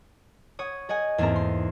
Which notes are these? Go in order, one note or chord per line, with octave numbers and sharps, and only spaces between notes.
C#5 F#5 D#6
G#4 D#5 F#5 G#5
E2 G#2 A#3 C4 A4 A#5
C6